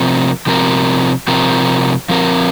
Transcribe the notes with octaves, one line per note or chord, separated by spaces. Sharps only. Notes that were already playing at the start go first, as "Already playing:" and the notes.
Already playing: C3 F3 C4 A#4
C3 F3 C4 A#4
C3 F3 C4 A#4
F3 C4 A#4